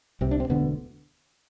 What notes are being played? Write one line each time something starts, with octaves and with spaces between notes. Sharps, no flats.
C2 C3 C4
D4
C4
E1 D2 D3 B3